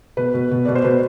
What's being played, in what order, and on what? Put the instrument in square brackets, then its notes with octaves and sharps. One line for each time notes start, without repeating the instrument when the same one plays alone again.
[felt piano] B2 B4
B2
B2
B2 D5
C5
B2 B4